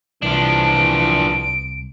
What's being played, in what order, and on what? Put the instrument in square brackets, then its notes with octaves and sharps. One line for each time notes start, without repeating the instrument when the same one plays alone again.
[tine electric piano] C2 [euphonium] E3 [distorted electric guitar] F3 D4 [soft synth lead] D7